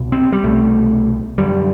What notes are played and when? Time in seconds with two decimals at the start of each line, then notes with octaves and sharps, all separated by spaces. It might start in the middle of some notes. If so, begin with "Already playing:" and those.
Already playing: C2 B2
0.12 C4
0.32 G3
0.44 C2 B2 A3
1.38 F#2 D3 G3